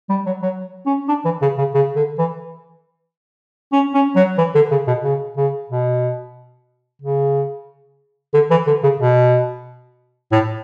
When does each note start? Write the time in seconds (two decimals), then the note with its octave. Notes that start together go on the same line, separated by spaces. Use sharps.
0.09 G3
0.26 F#3
0.42 F#3
0.86 C#4
1.08 D4
1.25 E3
1.42 C#3
1.58 C#3
1.75 C#3
1.96 D3
2.19 E3
3.73 C#4
3.94 C#4
4.16 F#3
4.38 E3
4.55 D3
4.71 C#3
4.87 B2
5.04 C#3
5.37 C#3
5.70 B2
7.02 C#3
8.34 D3
8.51 E3
8.67 D3
8.83 C#3
9.00 B2
10.32 A2